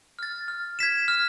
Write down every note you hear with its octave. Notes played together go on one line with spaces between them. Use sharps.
F6 A6
F6
G#6 B6 E7
F6